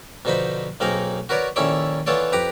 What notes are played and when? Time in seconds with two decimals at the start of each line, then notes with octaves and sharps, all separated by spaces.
0.25 B2 D3 F3 D#4 C5 B5
0.80 B1 A#3 C4 D#4 G#4 A#4
1.29 F#4 A#4 B4 C#5 D5
1.56 A#1 D#3 C#4 E4 A4 D5
2.06 E3 B3 F4 A4 C#5 D5
2.33 F2 G4 B4 A#5 D6